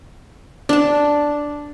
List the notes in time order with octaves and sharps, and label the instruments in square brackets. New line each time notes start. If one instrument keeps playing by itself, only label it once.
[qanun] D4 A5